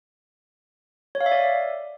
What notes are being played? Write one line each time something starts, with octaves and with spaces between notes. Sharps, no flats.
C#5
F5
E5
D5